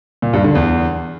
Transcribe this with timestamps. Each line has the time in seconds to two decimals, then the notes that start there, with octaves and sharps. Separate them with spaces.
0.22 A#2
0.33 G2
0.44 D3
0.55 E2